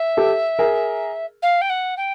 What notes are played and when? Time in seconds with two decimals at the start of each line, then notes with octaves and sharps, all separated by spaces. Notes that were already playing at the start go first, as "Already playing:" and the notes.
Already playing: E5
0.17 G4 A4
0.59 G#4 A#4
1.42 F5
1.61 G5
1.69 F#5
1.97 G5